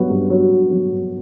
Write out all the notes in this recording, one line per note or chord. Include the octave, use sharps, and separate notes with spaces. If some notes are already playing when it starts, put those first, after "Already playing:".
Already playing: G2 F#3 B3 F#4
G2
F#3 B3 F#4
G2
F#3 B3 F#4
G2